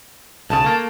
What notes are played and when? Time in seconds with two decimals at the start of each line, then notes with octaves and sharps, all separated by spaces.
0.50 B1 C#3 A5
0.64 A3 A#3